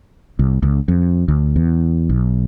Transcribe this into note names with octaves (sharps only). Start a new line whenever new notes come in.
C2
C#2
F2
D2
E2
B1